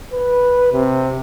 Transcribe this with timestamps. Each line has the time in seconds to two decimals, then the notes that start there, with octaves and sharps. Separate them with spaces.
0.12 B4
0.72 C3